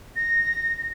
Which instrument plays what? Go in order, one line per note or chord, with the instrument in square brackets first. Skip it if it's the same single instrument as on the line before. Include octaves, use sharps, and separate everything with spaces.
[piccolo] A#6